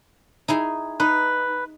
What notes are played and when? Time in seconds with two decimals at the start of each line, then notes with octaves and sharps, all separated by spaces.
0.48 D#4 E4 G#4
1.00 D#4 B4